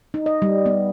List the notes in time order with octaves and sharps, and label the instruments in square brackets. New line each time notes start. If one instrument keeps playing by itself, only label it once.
[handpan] D#4
D#5
G3
B3